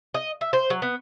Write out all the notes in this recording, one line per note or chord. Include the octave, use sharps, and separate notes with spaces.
D#5
E5
C5
F#3
B3